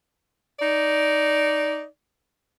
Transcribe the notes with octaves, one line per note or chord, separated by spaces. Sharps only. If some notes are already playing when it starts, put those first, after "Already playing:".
D#4 D5